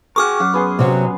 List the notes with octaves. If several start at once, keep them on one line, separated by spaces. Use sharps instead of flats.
F#4 G#4 A#4 C#6 D6 F6
F#2 F#5
B3 G#4 C6
C3 F#3